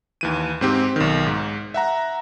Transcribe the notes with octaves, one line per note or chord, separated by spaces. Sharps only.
D#2 E3 D#7
G#2 C4 G4
B1 D#3
G#2
E5 F#5 A#5